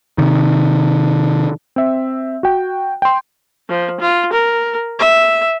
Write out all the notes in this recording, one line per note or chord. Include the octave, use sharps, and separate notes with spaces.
C3 D#3
C4 E5
F#4 G5
G5 C6
F3
F4
A#4
E5